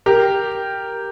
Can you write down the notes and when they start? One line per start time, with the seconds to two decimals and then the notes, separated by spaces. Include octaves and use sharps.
0.06 G4 A#4